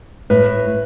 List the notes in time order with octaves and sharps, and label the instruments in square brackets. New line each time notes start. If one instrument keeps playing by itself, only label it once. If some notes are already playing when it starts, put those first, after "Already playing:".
[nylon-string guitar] A2 [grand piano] B4